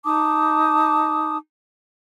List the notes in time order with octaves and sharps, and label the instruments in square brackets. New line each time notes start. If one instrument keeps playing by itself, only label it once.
[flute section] D#4 A5 D6 D#6